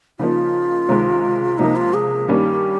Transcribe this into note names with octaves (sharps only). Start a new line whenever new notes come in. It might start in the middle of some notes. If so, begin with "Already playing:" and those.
C#3 F3 A#3 D#4 F4
C#2 C3 D#3 G#3
C#2 C3 F3 A#3 D#4
F4
G#4
G2 D#3 G3 A#3 C#4 G4